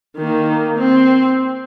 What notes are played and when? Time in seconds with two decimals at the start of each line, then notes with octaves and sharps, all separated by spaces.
0.17 D#3 A#3
0.77 C4